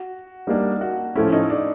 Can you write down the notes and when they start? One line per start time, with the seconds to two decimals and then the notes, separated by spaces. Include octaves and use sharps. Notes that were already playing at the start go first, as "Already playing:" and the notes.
Already playing: F#4
0.47 G3 A#3 D4 D#4
0.81 F#4
1.15 A2 F3 A3 C#4 E4
1.33 D#4
1.50 D4